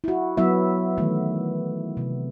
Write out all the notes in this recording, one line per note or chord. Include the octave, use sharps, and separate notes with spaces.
E4 F#4
F#3 B3 E4 E5
D#3 E3 A3 B3
C3